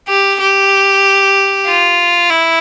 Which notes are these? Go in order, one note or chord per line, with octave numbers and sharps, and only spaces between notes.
G4
G4
F4
E4